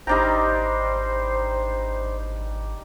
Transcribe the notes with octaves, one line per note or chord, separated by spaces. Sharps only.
G#1 G3 D4 D#4 C5 G5 A#5